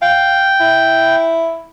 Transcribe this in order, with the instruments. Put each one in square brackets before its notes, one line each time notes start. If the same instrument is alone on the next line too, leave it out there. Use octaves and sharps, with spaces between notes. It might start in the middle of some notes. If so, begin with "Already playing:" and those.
[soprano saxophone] F5 [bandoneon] G5
[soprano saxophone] E4